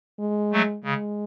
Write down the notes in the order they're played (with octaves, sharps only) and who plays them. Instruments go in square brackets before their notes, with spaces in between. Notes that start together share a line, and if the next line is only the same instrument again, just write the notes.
[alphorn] G#3
[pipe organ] F#3 A3
[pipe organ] C#3 [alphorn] G#3